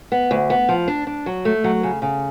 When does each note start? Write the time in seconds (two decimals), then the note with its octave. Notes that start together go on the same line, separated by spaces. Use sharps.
0.12 B3
0.31 D2
0.50 B3
0.69 F3
0.88 D4
1.07 D4
1.26 F#3
1.45 A3
1.64 F#3
1.83 C#3
2.02 C#3